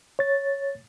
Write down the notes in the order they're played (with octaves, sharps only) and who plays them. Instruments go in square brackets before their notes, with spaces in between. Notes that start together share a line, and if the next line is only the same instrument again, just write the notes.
[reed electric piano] C#5 A6